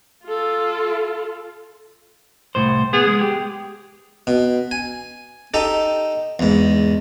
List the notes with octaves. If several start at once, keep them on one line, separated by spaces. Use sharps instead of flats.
F4 A4
C2 A2 C5
B3 G#4
G#3
G4
B2
G#5
D#4 G4 A4
E2 G#2